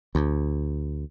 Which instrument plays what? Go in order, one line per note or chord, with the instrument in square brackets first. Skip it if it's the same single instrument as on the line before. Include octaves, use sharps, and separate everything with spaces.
[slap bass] D2